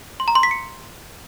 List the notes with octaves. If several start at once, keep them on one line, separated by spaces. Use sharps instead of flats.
C6
A#5
C6
B6
C#7